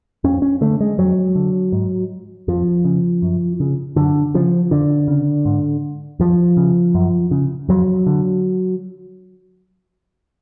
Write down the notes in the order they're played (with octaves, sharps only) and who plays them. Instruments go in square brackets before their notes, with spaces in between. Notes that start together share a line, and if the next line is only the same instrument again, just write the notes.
[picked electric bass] F2 C#4
C#4
D3 A3
G#3
F2 F#3
D3
G#2
F2 F3
C#3
F#2
C#3
F#2 D3
C#3 F3
F2 D3
C#3
G#2
F2 F3
C#3
F#2
C#3
F2 F#3
D3